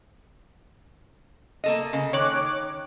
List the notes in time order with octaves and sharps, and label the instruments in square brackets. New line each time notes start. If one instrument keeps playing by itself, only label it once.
[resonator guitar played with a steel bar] A#3 A4 D#5
C#3
[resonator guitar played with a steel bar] D#3 [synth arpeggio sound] C#5 D6 F#6